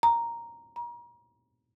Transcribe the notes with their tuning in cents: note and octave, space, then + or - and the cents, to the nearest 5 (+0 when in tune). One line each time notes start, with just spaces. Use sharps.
A#5 +0
A#5 +35